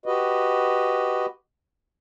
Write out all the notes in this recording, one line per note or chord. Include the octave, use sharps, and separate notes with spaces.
F#4 G4 B4 D#5